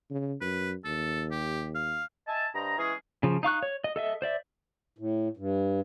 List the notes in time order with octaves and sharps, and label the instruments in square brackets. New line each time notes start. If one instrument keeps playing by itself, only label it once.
[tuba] C#3
[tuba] F#2 [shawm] B4
[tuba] D#2 [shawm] A4
[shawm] G4
F5
[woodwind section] D#5 E5 G#5 A5
G2 C5 D#5 A#5
E3 G#3 C#4 G#4
[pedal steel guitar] C#3 F3
D#4 F5 C#6 F#6
C#5
D#5
A4 D#5 E5
C5 D5 E5
[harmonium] A2
G2